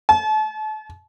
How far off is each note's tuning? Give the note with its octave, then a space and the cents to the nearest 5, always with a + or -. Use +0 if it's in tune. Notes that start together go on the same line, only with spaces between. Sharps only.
A5 -35